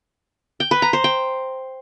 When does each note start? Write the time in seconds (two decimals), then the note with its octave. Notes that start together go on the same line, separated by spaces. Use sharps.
0.60 G5
0.71 B4
0.82 A#5
0.93 C5
1.04 G5